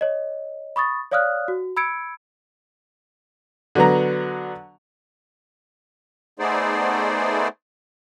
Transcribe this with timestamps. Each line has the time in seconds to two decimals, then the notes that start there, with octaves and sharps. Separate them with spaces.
0.01 C#5 D#5
0.76 B5 C#6 D#6 A6
1.11 C#5 D5 F5 D#6 F6 F#6
1.48 F#4
1.77 B5 E6 G#6 C#7 D7
3.75 D3 F#3 B3 A#5
6.39 A3 B3 D#4 G#4 C5 D5